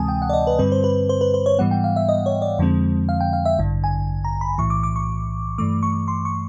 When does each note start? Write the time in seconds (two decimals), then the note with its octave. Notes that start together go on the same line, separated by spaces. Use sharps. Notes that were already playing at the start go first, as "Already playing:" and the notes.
Already playing: D2 C3 E3 G#3 C4 G#5 A5 D#6
0.08 G5
0.22 F#5
0.30 D5
0.33 D#5
0.47 B4
0.59 G2 D3 G3 C4 B4
0.72 C5
0.84 B4
1.09 C5
1.21 B4
1.34 C5
1.46 C#5
1.59 G#2 E3 G3 B3 F#5
1.71 G5
1.84 F5
1.96 E5
2.09 D#5
2.26 C#5
2.42 D5
2.58 F2 D3 F3 G#3 C4
3.09 F5
3.21 G5
3.33 F5
3.45 E5
3.59 A1 G2 D3
3.84 G#5
4.24 A#5
4.41 B5
4.58 B1 A2 E3 C#6
4.70 D6
4.83 D6
4.96 C#6
5.58 G2 E3 A3 D6
5.83 C#6
6.08 C6
6.25 C#6